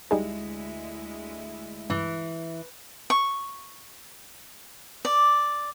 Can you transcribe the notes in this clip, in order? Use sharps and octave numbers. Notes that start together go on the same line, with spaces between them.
D2 G3 G#3 D#4 E4 G#4
G2 E3
C#6
D5